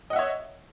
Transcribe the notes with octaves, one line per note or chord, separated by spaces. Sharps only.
C#5 D#5 E5 F#5